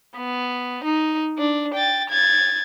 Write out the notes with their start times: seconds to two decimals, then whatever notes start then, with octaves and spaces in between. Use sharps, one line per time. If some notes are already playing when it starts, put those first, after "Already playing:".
0.17 B3
0.84 D#4
1.38 D4
1.74 G5 A6
2.10 G#6 A6